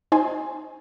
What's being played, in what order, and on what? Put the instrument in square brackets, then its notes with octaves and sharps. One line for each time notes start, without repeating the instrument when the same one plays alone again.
[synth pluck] D#4 C5 G#5